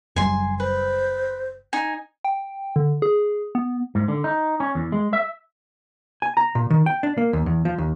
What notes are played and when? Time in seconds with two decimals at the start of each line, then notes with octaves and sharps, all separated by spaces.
0.16 F#1 F#2 G3 G#5 C6
0.60 B4 C5
1.73 D#4 G#5
2.25 G5
2.76 D3
3.02 G#4
3.55 B3
3.95 G#2
4.08 D3
4.24 D#4
4.60 C#4
4.75 E2
4.92 G#3
5.13 E5
6.22 G#5
6.37 A#5
6.55 A#2
6.70 D#3
6.86 G5
7.03 D4
7.18 A#3
7.33 D#2
7.46 E2
7.65 F3
7.78 D#2